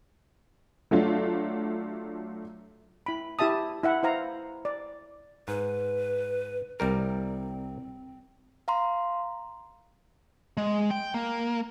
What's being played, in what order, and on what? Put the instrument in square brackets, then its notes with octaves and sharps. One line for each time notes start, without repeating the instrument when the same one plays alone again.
[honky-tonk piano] F#3 A3 D4 F4
[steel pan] E4 B5
E4 G4 E5 A5 D#6
E4 E5 F#5
E4 C5 F5 A#5
D5
[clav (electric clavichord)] G#2 [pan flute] B4
[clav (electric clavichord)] C2 G3 A#4 [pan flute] C4
[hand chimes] F5 A#5 C6
[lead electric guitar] G#3
G5
A#3